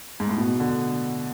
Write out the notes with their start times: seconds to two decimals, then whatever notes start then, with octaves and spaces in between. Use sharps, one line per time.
0.20 G#2
0.29 A2
0.38 B2
0.60 D3